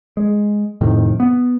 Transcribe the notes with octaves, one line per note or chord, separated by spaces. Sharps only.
G#3
F2 A2 C3 D#3
B3